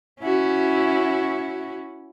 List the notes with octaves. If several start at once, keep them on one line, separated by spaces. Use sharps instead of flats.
C#4 E4 F#4